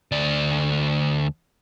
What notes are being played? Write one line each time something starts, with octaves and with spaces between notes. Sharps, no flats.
D2 D5